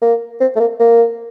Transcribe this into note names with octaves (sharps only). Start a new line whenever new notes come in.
A#3
C4
A3
A#3
A#3